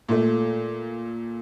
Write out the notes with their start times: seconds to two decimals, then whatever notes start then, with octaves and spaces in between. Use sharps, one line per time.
0.09 A#2 A3